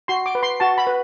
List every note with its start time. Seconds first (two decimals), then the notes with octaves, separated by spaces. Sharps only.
0.08 F#4 C6
0.26 D6
0.35 B4
0.43 C6
0.60 F#4 A5
0.78 B5
0.87 B4